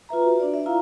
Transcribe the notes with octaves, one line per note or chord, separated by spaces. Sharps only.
F4 B4 E5 A#5
F#4
D4 D5
E5
E4 F4 F5 A#5